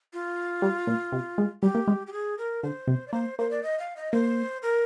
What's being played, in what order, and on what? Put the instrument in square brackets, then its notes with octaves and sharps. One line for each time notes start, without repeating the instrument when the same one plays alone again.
[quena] F4
[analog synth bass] G3
A#2
C3
G#3
[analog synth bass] G3 [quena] G4
[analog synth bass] A#3
G#3
[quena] G4
G#4
A#4
[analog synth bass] D3 [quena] C5
[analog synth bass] C3
[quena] D5
[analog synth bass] A#3 [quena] C5
[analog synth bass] A#3 [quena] C5
[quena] D5
D#5
F5
D#5
[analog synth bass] A#3 [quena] C5
[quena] A#4